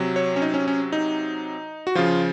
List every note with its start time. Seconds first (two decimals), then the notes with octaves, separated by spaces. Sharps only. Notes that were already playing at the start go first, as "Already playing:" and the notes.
Already playing: C3 F#3
0.16 C#5
0.36 C#4
0.42 D#4
0.54 C#4
0.68 C#4
0.92 D#4
1.87 F#4
1.95 C#3 F3 F4